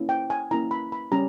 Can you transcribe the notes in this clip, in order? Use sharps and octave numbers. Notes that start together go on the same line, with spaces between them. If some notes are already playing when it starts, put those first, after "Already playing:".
Already playing: A#3 C#4 E4
G5
G#5
A#3 C#4 E4 A#5
B5
B5
G3 C#4 G4 A#5